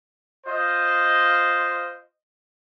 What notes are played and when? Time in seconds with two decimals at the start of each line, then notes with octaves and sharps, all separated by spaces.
0.47 F4 C5 D#5